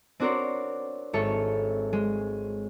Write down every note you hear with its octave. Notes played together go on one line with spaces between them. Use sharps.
C4 D4 F#4 A#4 C5 C#5
G#1 A4 C#5 E5 C#7
G#3